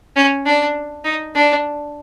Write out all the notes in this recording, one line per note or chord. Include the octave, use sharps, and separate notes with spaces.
C#4
D4
D#4
D4